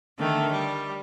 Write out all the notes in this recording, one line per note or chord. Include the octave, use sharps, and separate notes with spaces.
D3 D#3 A3
G3